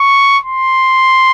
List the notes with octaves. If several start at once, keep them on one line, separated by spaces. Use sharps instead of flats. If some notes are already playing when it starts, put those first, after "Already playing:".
Already playing: C#6
C6